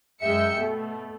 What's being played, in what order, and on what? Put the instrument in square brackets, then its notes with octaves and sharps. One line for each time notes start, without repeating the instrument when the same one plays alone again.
[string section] F#2 G#3 E5 G5 C#7
B2 A3